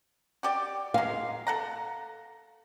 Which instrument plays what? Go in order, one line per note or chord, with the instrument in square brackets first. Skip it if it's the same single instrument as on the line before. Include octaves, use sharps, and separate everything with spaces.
[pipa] F#4 G4 D5
[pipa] F#3 G#3 [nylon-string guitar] F5
[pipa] A4 F#5 A#5